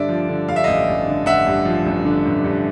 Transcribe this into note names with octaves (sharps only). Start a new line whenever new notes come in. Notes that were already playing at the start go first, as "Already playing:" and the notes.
Already playing: G2 D3 D5 E5
F3
D3
G2 F5
E5
A1 D#5 F5
A1
D3
A1 E5 F#5
G2
F3
A1
D3
A1
G2